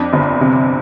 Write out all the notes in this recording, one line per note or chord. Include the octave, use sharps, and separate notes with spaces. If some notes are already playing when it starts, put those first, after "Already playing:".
Already playing: F2 D4
G1
C3